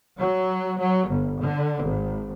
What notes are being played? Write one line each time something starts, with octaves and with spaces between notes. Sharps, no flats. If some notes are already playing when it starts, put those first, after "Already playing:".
F#3
F#3
G1
D3
G#1